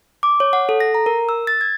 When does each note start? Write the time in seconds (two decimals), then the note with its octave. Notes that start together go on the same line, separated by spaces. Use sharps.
0.23 D6
0.40 C#5
0.53 F#5
0.69 A4
0.80 A#6
0.95 A#5
1.06 A#4
1.29 E6
1.47 A6
1.61 G#6